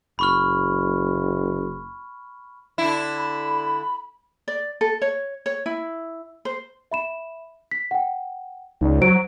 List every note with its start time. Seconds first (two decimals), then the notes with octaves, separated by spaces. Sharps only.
0.19 F#1 B5 C#6 F6
2.78 D3 E4
3.17 B5
4.48 D5
4.81 A4
5.02 C#5
5.46 C#5
5.66 E4
6.45 C5
6.91 E5 B5 E7
7.71 B6
7.91 F#5 G5
8.81 C#2 D#4 D5
9.01 F#3 C5 D7